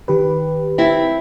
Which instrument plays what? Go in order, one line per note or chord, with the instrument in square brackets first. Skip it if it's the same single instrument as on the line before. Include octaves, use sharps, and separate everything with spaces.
[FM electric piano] D#3 G4 B4
[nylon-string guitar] C4 E4